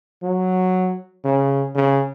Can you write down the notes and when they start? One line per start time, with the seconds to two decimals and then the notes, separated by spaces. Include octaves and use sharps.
0.23 F#3
1.25 C#3
1.75 C#3